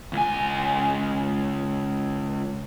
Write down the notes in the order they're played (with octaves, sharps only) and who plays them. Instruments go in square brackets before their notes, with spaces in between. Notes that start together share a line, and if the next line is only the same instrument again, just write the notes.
[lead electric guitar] C#2 G#5